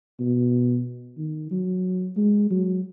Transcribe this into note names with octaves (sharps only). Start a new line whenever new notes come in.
B2
D#3
F#3
G#3
F#3